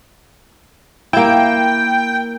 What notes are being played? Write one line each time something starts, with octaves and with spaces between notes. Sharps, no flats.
A#3 E4 G5